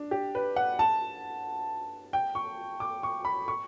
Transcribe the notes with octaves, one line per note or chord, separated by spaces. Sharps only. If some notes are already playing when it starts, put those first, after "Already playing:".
Already playing: D4
G4
B4
F#5
A5
G5
C#6
D6
C#6
B5
C#6